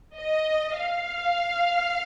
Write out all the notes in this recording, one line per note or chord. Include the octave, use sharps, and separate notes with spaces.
D#5
F5